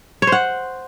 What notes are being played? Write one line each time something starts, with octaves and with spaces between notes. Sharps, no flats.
C#5
C5
F#5